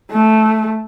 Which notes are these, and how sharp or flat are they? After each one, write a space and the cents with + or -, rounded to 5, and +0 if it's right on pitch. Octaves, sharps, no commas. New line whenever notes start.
A3 -5